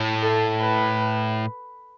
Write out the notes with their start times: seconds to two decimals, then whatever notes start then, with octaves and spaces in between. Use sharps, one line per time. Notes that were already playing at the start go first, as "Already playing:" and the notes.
Already playing: A2
0.22 A4
0.60 B4